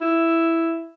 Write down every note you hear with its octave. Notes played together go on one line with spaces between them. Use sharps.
E4